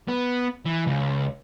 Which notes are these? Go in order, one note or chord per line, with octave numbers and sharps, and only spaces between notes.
B3
E3
C#2